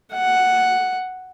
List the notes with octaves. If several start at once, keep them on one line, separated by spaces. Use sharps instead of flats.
F#5